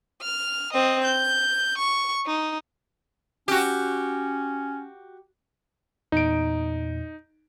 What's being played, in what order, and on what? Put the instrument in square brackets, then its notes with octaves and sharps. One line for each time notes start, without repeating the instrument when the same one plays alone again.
[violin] F6
C4 D#5
G6
C#6
D#4
[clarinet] C#4 [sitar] F#4 G4
[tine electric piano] E2 A#2 [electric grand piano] D#4 D7